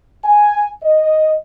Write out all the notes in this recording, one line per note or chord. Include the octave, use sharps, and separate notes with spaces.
G#5
D#5